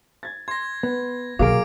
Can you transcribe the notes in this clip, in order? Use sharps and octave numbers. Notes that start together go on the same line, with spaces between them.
G#6 A6
C6 G#6 A#6
B3
B1 F#3 A#3 G#4 A#4 F5 D6 D7